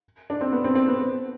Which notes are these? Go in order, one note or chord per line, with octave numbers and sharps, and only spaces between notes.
D4
C4
B3
C4
C4
B3